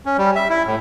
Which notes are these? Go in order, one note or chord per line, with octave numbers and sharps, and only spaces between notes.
C#4
G3
E5
E4
A2